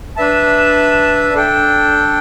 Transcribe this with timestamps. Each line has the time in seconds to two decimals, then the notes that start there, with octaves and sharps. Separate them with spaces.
0.16 D4 B4 E5 A5
1.33 D4 A4 G5